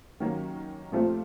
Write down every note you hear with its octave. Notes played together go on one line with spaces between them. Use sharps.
D#3 F#3 A#3 C#4
A#2 F3 A3 C4 F4